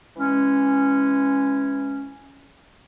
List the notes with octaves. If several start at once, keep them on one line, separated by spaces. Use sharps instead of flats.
E3 G#3 C#4